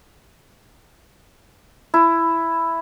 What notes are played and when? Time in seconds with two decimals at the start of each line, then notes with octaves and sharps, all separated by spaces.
1.94 E4